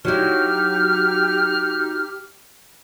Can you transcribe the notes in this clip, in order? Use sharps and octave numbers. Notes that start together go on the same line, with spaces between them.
F#3 D#4 E4 G4 F6